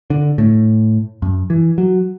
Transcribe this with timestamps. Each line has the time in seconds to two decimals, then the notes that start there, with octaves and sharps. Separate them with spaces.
0.10 D3
0.38 A2
1.22 F#2
1.50 E3
1.78 F#3